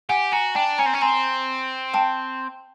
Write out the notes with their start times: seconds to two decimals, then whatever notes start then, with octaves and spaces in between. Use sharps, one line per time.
0.09 G4 F#5 G#5
0.32 F#4 G#5 A#5
0.55 D4 G5 A5
0.78 C#4 G#5 A#5
0.86 C4
0.94 C#4
1.01 C4 G#5 A#5
1.94 G5 A5